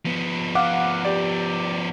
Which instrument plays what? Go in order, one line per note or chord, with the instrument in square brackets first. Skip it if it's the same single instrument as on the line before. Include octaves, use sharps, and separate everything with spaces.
[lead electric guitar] F3 B3
[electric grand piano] F5 F#5 D6
G4 D5